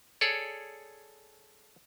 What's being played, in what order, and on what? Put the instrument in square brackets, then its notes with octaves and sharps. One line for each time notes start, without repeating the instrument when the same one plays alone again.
[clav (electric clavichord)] G#4 A4 C#5 D5